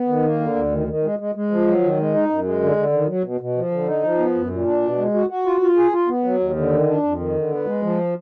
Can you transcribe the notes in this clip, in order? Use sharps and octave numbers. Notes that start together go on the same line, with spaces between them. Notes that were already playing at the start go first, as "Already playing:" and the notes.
Already playing: B3
D#3
A#3
D3
D2
D#3
D#3
G#3
G#3
G#3
F3
F#3
D#3
G#3
D#4
F#2
G#3
D3
D3
D#3
F#3
B2
B2
F3
D3
D#4
F3
B3
F#2
A#2
D4
B2
G#3
F#4
F#4
F4
F4
G#4
F4
B3
F#3
D#2
D3
D#3
D4
F2
D#3
D3
B3
G#3
F3